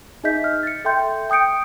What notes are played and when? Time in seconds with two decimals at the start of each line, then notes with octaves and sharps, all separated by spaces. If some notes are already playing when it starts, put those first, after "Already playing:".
0.24 D#4 G#4 D#5 E5 G6 B6
0.44 F6
0.63 A6 C#7
0.85 A4 E5 G5 C6 G6
1.30 G5 D#6 G6 C#7 D7